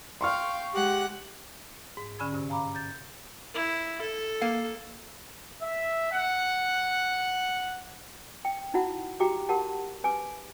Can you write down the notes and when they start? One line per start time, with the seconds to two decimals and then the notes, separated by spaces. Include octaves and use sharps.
0.21 F5 G5 C6 C#6 F6
0.74 G#3 G4 F#5 F#6
1.97 G#2
2.19 D3 C#4 G#5 B5 E6 G#6
2.33 G2 C3
2.49 F5 G#5 A#5 B5 D6
2.75 G6 A6
3.54 E4
4.01 A4
4.42 A#3 F5
5.62 E5
6.12 F#5
8.45 G5
8.74 D#4 E4 F#4 F#5 B5
9.20 F#4 G4 G5 A#5 D6
9.49 G4 A#4 F#5 A5 B5
10.04 B4 G#5 D6